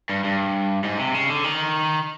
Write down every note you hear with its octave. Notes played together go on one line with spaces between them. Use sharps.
G2
G2
G#2
C3
C#3
D3
D#3